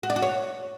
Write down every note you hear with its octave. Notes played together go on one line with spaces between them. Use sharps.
F#4
D5
F#4
C#5